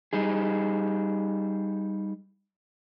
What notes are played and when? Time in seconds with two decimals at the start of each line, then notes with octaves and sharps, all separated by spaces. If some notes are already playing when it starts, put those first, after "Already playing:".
0.13 G3 D#4 G#4